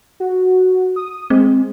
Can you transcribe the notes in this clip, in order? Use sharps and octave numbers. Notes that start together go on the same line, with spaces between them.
F#4
D#6
G#3 C4